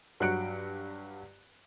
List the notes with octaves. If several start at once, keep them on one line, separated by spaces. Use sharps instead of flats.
G2 F#3 F#4 F#6 C#7 D7